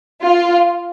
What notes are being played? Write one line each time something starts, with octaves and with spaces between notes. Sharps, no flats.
F4